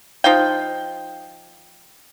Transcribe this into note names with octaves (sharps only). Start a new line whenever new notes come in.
F3 D#4 F5 G5